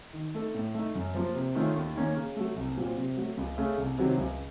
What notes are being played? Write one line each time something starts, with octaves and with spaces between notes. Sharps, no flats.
D#3
A3 D#4 A4
A2
A3 D#4
F#2
F3 A#3 F4
C3
D#3 A3 C#4 F4
D#2
D#3 A#3 C#4
C#3
F#3 A3
C2
A#2 F#3 C4 F4
C3
F#3 A3
C#2
C#3 A3
C2
C3 D#3 F#3
C#2